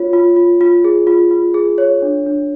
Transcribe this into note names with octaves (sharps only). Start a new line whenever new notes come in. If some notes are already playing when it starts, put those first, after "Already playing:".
Already playing: F4 C#5
F4
F4
F4
G#4
F4
F4
G#4
C#5
D4
D4